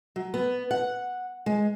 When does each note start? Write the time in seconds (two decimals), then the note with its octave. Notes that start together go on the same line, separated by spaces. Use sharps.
0.16 F#3
0.34 B3
0.71 F#5
1.46 G#3